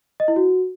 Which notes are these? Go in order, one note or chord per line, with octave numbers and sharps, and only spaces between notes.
D#5
E4
F#4